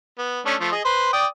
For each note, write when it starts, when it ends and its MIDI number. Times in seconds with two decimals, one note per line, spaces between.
0.18 0.40 59
0.46 0.55 57
0.46 0.55 61
0.46 0.55 62
0.60 0.71 53
0.60 0.71 57
0.72 0.83 68
0.72 0.83 75
0.85 1.09 71
0.85 1.09 72
0.85 1.09 84
1.13 1.26 74
1.13 1.26 79
1.13 1.26 87